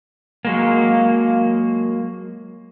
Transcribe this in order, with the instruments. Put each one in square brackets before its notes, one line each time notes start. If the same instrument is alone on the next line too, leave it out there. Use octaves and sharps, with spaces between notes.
[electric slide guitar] F#3 G#3 A#3